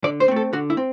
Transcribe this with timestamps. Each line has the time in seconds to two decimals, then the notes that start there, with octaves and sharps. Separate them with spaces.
0.04 D3 D5
0.20 C5
0.28 A3 C4
0.36 A4
0.53 D3 F#4
0.70 E4
0.77 C4